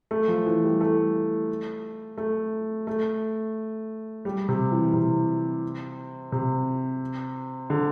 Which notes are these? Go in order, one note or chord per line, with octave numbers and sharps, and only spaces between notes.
A3
F3
E3
G3
A3
A3
A3
G3
C3
E3
C3
C3
D3